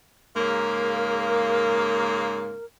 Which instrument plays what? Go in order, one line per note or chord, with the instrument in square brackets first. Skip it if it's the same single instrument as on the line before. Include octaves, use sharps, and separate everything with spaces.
[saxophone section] G#2 C#3 A#3 [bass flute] A#4